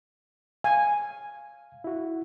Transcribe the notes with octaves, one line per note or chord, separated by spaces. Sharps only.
F5 G#5
E4 F#4